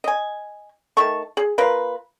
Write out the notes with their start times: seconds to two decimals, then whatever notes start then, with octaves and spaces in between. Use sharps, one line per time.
0.04 D#5 G#5
0.97 D#3 A3 A5 C#6
1.37 G#4
1.58 A#3 F4 A#4 B4